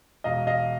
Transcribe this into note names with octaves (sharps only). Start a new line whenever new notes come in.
E1 D#5 F5
D#5 F5